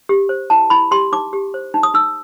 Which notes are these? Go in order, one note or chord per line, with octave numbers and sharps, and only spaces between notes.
G4
C5
E4 A5
E4 B5
G4 C6
D#4 D6
G4
C5
D#4
D#6
D#4 E6